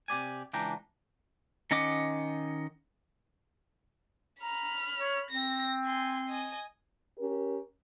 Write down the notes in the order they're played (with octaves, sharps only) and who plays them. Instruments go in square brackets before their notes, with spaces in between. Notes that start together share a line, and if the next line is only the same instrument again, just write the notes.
[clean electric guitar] C3 G4 D5 G#5
C#2 E3 D4 G5 A#5
[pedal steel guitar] D#3 C#4 D#5 F#5 D6
[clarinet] A#5 [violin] B5 F6
[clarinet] C#5
[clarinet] C4 [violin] A#6
[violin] G#5 C6
D#5 G#5
[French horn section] C#4 G4 A#4